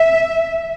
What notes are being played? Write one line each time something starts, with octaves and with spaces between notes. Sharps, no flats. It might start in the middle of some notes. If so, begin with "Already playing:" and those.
Already playing: E5